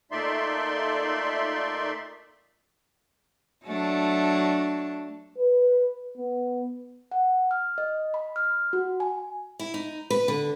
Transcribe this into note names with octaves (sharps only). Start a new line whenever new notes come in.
A#2 A3 D#4 D5 E5 C6
F#3 A3 D4
B4
B3
F#5
F6
D#5
B5
F6
F#4
G#5
E4
D#4
B4
D3